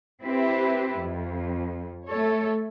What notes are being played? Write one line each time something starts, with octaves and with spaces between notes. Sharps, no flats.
C4 E4 G4 B4
F2
A3 A4 C#5